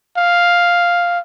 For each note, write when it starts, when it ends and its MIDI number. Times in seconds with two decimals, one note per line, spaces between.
0.17 1.19 77